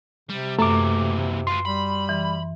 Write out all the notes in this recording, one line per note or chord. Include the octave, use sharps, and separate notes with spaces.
C3 G3
F#2 A#2 E3 A3 D6
F4 B4 C6
G3 B5
E3